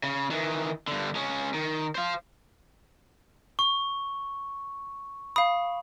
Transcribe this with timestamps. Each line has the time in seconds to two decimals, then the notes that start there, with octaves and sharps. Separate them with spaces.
0.03 C#3
0.30 D#3 E3
0.88 G2 D3
1.15 G#3 C#4
1.54 D#3
1.95 C5 F5
3.59 C#6
5.36 F5 B5 D#6